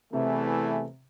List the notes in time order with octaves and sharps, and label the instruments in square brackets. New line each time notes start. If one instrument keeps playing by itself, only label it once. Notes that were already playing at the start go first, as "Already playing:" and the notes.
[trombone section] E2 E3 A3 [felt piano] C3